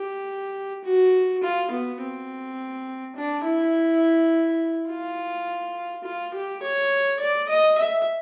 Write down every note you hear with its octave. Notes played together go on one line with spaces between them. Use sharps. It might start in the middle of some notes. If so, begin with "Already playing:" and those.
Already playing: G4
F#4
F4
B3
C4
D4
E4
F4
F4
G4
C#5
D5
D#5
E5